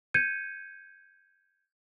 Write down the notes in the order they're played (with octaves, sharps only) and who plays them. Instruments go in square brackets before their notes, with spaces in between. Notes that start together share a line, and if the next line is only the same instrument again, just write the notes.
[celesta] G6 G#6 C#7 D#7